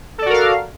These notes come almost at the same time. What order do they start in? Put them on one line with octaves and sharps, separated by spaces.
A4 D5 F#4 A#4 F5